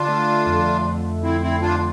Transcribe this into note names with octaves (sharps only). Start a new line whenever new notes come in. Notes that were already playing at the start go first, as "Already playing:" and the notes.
Already playing: D3 D4 F4
A3
F2
F2
D3 C4 E4
C4 E4
F2 D4 F4